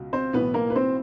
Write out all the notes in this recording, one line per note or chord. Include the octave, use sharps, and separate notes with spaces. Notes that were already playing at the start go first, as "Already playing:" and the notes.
Already playing: C#2 B2
C4 C5
B1 A2 E3 B3 B4
A#3 A#4
B4
C4 C5